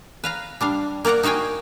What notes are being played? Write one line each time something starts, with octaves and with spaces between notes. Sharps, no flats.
B4 F5 A#5
G3 D4 F5
A#3 A#4 D5 F#5 A#5
D#4 F#4 F5 G5 G#5